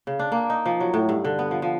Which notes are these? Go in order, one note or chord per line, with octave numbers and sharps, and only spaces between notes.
C#3
D4
A#3
D#4
F3
F#3
A2
G2
D3
B3
F3
F3